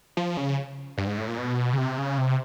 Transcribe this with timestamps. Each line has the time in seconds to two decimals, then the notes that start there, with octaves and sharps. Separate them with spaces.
0.17 F3
0.37 C#3
0.98 G2
1.07 G#2
1.18 A2
1.28 A#2
1.38 B2
1.73 C#3
1.78 C3
1.98 C#3
2.18 C3